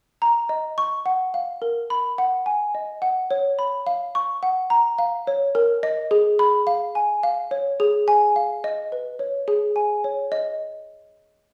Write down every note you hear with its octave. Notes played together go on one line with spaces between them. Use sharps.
A#5
D#5
C#6
F#5
F5
A#4
B5
F#5
G#5
D#5
F#5
C#5
B5
F5
C#6
F#5
A#5
F5
C#5
A#4
D#5
G#4
B5
F5
G#5
F5
C#5
G#4
G#5
F5
D#5
B4
C#5
G#4
G#5
C#5
D#5